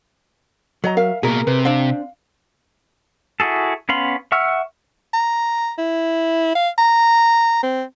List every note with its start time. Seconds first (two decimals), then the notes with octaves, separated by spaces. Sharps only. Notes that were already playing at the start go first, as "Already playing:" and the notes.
0.84 F#3 C#5 D#5 A#5
0.97 A#4 E5 F5
1.23 B2 A#3 G#4 A#4 E5
1.47 C3 B4
1.65 C4 D4 F5
3.40 E4 F#4 G#4 A4
3.89 B3 C#4 F5 B5 C6
4.32 E5 F#5 C#6 E6 F6
5.14 A#5
5.78 E4
6.55 F5
6.78 A#5
7.63 C4